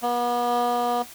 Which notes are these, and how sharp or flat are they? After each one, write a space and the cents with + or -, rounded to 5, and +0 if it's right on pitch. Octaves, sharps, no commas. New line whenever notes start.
B3 -40